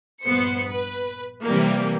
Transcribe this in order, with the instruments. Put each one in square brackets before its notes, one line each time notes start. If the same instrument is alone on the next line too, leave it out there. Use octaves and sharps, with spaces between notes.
[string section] A#1 G2 B3 C5 C#7
B4
C3 E3 G3 A#3